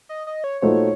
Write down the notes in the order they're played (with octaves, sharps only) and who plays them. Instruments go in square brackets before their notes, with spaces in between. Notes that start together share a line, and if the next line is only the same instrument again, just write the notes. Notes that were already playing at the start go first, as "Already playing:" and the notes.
[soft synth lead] D#5
D#5
C#5
[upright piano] A#2 A3 D#4 F#4 C5 [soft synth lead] C#5